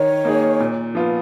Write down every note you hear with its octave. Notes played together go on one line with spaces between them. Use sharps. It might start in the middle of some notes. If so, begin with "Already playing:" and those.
Already playing: D#3 C#5
A#3 D#4 G#4
A#2
F3 B3 F4